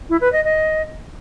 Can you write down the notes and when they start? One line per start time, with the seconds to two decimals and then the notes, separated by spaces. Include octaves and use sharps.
0.10 E4
0.21 B4
0.33 D#5
0.44 D#5